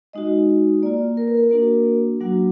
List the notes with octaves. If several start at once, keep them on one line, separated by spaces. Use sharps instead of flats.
G#3 D#4 F#4 D#5
A#3 F4 D5
A#4
B4
A#4
A#3 D4 F#4
F#3 A#3 D4 F#4